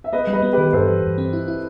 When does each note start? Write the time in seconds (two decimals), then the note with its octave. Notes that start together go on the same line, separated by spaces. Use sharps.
0.04 E5
0.13 B3 B4 D#5
0.27 G3
0.33 B4 D#5
0.42 B3
0.53 D#3 G4 B4
0.73 G2 A4 C5
0.88 E3
1.02 G2
1.18 C4
1.33 E4
1.48 E4